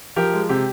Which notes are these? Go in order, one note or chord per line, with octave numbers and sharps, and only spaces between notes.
F3 G4 A#4
G#3
C3 G4